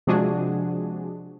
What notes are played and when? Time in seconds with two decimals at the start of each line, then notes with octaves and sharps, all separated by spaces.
0.07 C3 F3 G#3 D4 F#4 G#4